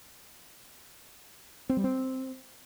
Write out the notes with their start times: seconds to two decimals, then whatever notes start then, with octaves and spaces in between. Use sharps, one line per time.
1.69 C4
1.77 G3
1.84 C4